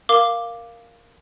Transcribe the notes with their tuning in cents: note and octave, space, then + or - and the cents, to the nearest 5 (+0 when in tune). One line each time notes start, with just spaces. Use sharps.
A#4 +0 F5 +0 D6 +0